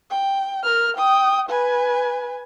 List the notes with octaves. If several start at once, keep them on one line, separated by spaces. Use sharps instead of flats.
G5
A#4 F6
G5 D#6
B4 G#5